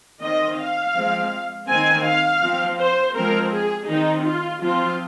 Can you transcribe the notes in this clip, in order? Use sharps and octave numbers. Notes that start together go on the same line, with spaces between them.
D#3 C4 D#5
F5
F3 G#3 C4
D#3 C4 G#5
F5
F3 C4
C5
F3 G#3 C4 A#4
G#4
D#3 C4 D#4
F4
F3 C4 F4